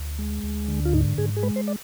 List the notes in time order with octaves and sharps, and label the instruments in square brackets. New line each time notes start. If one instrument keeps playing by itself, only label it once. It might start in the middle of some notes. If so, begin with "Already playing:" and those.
Already playing: [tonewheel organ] D2
G#3
D2
D3
F4
G#2 D#4
G#2 G#4
G#4
G#3 B4
C5
D5